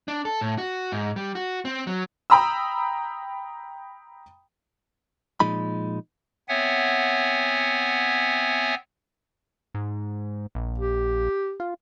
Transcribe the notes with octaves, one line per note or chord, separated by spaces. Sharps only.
D4
A4
A2
F#4
G#2
G3
F#4
C4
F#3
G5 A#5 B5 D#6 E6
A#2 F3 G#3 D#4 B5
B3 C4 C#5 E5 F#5 G#5
G#2
A#1
G4
F4